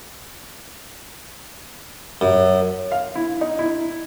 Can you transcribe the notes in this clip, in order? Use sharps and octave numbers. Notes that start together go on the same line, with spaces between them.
F#2
F5
E4
D#4
E4